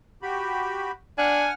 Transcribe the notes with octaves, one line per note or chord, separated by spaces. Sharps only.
F#4 G4 B5
D4 F#5 G#5 F6